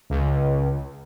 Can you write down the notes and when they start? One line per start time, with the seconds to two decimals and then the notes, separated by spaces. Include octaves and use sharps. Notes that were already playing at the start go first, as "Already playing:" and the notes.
0.10 C#2